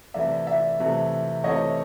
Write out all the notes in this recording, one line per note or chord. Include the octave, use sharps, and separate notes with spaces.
C3 E3 A3 D5 E5
D5 E5
C3 E3 A3
C3 E3 A3 C#5 D#5